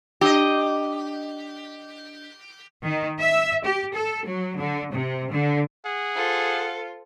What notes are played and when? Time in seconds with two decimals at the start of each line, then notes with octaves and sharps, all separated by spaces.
0.21 D4 G4 D#5
2.84 D#3
3.20 E5
3.65 G4
3.95 A4
4.26 F#3
4.58 D3
4.94 C3
5.32 D3
5.85 G#4 F#5
6.15 F4 A4 C5